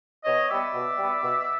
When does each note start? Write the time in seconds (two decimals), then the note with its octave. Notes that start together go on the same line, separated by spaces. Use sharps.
0.25 B2 C#5 D#5
0.49 G3 B3 D5 E5
0.73 B2
0.97 G3 B3
1.21 B2